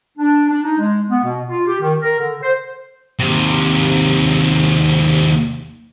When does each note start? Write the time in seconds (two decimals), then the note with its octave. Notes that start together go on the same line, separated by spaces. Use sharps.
0.18 D4
0.50 D4
0.63 D#4
0.79 G#3
1.09 B3
1.24 B2
1.49 F4
1.67 G4
1.80 D#3
2.02 A#4
2.18 D3
2.43 C5
3.19 D#2 C3